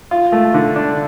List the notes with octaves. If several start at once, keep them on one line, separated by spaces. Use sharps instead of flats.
F4
A3
D3
D4